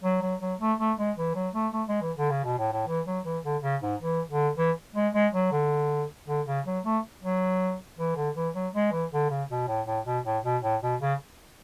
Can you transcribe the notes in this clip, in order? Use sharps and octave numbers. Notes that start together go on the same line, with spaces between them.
F#3
F#3
F#3
A3
A3
G#3
E3
F#3
A3
A3
G#3
E3
D3
C#3
B2
A2
A2
E3
F#3
E3
D3
C#3
G#2
E3
D3
E3
G#3
G#3
F#3
D3
D3
C#3
F#3
A3
F#3
E3
D3
E3
F#3
G#3
E3
D3
C#3
B2
A2
A2
B2
A2
B2
A2
B2
C#3